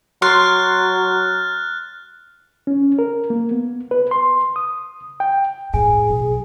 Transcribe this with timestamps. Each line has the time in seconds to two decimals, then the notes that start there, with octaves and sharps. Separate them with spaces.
0.22 F#3 C6 F6 F#6 A6
2.67 C#4
2.99 A#4
3.30 A#3
3.51 B3
3.91 B4
4.11 C6
4.56 D#6
5.20 G5
5.74 A2 G#4 G#5
6.10 B1